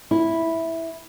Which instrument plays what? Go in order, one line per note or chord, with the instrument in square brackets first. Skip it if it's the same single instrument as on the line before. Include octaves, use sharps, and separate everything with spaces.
[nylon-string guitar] E4